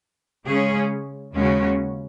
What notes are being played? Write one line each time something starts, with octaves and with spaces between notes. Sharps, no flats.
C#3 G#3 C#4 G#4
D#2 C#3 G#3 C#4 F#4